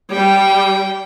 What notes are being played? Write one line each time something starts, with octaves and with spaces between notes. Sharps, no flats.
G3 G5